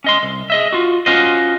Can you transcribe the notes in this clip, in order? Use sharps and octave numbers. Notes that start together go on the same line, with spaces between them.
C#4 D#5 C6
C2
G#4 D#5 E5
F4 F#4
C#4 F4 F#4 C5 D#5